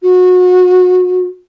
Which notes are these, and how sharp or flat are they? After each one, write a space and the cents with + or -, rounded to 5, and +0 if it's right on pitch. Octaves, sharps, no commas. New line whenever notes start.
F#4 -30